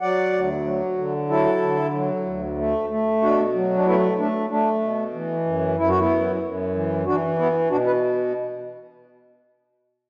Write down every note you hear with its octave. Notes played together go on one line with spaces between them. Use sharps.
F#3 D5 F#5
D2
F#3
D3
F#3 E4 A4
D3
F#3
D2
A3
A3
B2 D4 F#4
F#3
D4
A3 B3 E4
A3 D4
A3 D4
B2
E3
F#2
F#2 E4
F#4
B3 E4
F#2
F#2
E3
E3 D4 F#4
B3 E4
B2 D4 F#4
B4